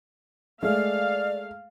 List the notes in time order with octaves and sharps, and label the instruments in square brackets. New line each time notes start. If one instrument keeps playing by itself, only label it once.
[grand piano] G#3 A3 [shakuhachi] D5 [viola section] F5